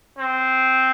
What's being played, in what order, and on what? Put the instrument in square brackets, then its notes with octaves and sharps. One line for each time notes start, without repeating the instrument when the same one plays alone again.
[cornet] C4